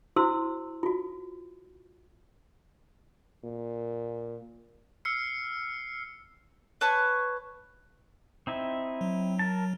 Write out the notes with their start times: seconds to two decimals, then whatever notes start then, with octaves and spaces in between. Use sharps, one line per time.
0.16 E4 F#4 C5 C6 E6
0.83 F4 F#4
3.44 A#2
5.05 E6 F6 C7 C#7
6.81 B4 C#5 A5 C#6
8.47 C4 D#4 E4
9.01 F#3
9.39 A#4 A5